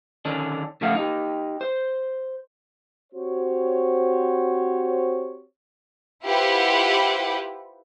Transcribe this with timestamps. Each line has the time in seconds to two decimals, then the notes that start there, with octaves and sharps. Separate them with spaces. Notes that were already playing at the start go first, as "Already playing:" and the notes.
0.25 D3 D#3 C#4 D4
0.81 C#3 F3 A3 A4 F5 F#5
0.95 D#4 G4
1.61 C5
3.13 C4 F#4 G4 C5 C#5
6.24 E4 F4 G4 B4 C5 F#5